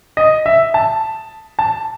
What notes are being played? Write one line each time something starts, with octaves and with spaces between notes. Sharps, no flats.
D#5
E5
A5
A5